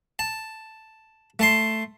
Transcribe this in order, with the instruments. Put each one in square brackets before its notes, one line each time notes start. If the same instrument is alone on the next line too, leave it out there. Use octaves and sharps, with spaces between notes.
[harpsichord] A5
A3 A5 C6